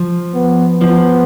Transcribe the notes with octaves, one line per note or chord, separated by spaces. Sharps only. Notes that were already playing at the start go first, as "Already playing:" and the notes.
Already playing: F3
B3
F3 B3